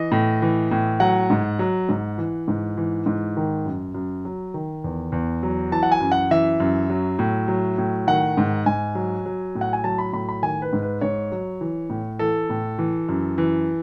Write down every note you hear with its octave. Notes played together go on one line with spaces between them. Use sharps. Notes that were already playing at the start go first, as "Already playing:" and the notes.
Already playing: E3 D#5
A2
E3
A2
F#3 F#5
G#2
F#3
G#2
E3
G#2
E3
G#2
D#3
F#2
F#2
F#3
D#3
E2
E2
F#3
E3 A5
F#5
G#5
F#2
F#5
E3 E5
F#2
F#3
A2
F#3
A2
D#3 F#5
G#2
G#2 G#5
F#3
F#3
A2
F#5
G#5
F#3 A5
B5
A2 B5
B5
D#3 G#5
B4
G#2
B4
G#2 C#5
F#3
E3
A2
E3 A4
A2
E3
F#2
E3